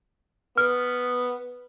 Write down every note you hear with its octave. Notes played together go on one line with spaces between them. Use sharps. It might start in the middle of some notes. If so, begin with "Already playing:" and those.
B3 F6